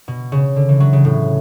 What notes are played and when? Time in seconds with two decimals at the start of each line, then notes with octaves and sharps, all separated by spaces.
0.08 B2
0.32 C#3
0.56 D3
0.69 E3
0.80 F#3
0.93 C#3
1.05 A2